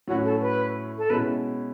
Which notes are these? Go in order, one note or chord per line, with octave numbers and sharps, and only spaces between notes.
A2 F#3 C#4 E4 F#4
A4
B4
A4
B2 G#3 C#4 E4 B4